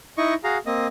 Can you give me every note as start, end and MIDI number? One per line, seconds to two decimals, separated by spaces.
0.18 0.34 63
0.18 0.34 64
0.18 0.34 75
0.18 0.34 85
0.44 0.58 66
0.44 0.58 68
0.44 0.58 77
0.44 0.58 82
0.66 0.87 58
0.66 0.87 60
0.66 0.87 75